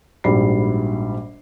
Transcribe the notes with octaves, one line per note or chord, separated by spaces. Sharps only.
A#1 G#2 G3 F#4 B5 C7